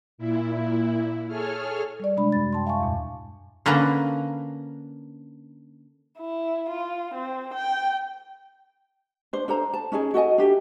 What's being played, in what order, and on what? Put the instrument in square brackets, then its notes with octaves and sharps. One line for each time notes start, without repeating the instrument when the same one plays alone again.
[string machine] A#2 E4
G#4 A4 C#5 F6
[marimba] G3 D5
C3 G#3 D4 B5
F#2 A6
G5 A5 C6
E5 F5 G#5 A5 C#6
E2 A#2
[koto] D3 A#3 C#4 B4 A#5
[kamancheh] E4
F4
C4
G5
[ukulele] D4 C5
D4 A4 C5 A#5
A5
C#4 D#4 G#4 D#5
F#4 A4 D#5 G#5
D4 G4 E5